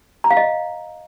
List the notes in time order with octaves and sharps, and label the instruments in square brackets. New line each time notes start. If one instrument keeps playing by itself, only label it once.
[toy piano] A#5
F5
D#5